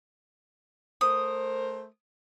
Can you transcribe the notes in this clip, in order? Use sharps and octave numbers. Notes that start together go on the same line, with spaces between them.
A3 A#4 C5 D#6